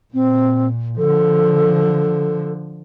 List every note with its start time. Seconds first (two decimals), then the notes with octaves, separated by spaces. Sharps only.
0.14 A#2 C4
0.98 D3 F3 A4